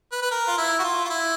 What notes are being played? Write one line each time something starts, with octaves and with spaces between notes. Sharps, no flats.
B4
B4
A#4
F4
E4
F#4
F4
F4
E4